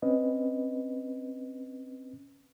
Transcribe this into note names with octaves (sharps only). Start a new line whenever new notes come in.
C4 C#4 B4 D#5